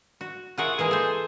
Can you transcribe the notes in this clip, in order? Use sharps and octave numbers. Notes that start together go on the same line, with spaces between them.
F#4
F4 G#4 A#4 C#5 E5 F#5
E3 G#3 A#3 G#4
A4 C5